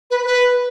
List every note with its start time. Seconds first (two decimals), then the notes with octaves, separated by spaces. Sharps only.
0.11 B4
0.26 B4